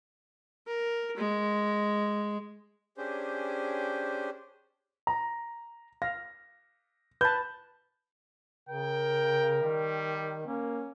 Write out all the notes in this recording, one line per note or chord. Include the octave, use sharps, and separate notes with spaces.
A#4
G#3
C#4 D4 G4 G#4 C5
A#5
F5 A#6
B4 A5 G6
C#3 A#4 G5
D#3 G3
A#3 C#4